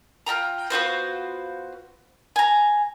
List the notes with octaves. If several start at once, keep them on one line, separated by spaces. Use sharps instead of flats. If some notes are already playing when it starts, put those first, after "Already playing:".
F4 D#5 G5 A#5
B3 F4 F#4 C5
G#5 A#5